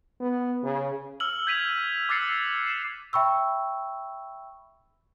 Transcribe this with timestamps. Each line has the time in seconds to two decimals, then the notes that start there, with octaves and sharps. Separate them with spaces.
0.21 B3
0.64 C#3
1.20 E6 F6 F#7
1.47 G6 G#6 B6 D#7 F7 F#7
2.09 D6 E6 F#6 A6 C7 C#7
2.66 C7 E7
3.13 E5 G5 B5 C#6 E6